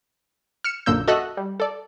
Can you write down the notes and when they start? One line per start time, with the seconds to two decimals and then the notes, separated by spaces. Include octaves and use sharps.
0.64 F6 C#7 E7
0.86 A#1 F#2 D3 A#3 E6 G6
1.08 F#4 A4 D#5 E5 E6 F#6
1.37 G3
1.60 A4 D5